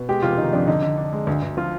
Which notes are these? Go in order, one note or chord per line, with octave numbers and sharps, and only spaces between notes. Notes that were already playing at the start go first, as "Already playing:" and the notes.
Already playing: B2
G#3 G4
F1 F4
D#3 D#4
F2 D4
D3 D#4
D3 D#4
D4
G#3
D2
D2
F3 F4